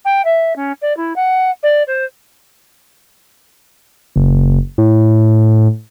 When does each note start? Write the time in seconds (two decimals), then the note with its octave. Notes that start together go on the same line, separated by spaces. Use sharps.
0.05 G5
0.24 E5
0.55 C#4
0.81 D5
0.96 E4
1.15 F#5
1.63 D5
1.87 C5
4.16 F#1
4.78 A2